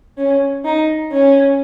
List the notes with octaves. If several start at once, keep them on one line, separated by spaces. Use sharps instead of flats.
C#4
D#4
C#4